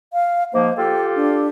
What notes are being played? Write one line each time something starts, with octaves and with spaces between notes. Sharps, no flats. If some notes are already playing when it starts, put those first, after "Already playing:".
F5
G#2 F3 A#3 C5
F4 G4 A4 G5
D4